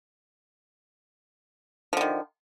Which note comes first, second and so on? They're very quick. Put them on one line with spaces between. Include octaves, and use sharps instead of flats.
F3 D3 D#3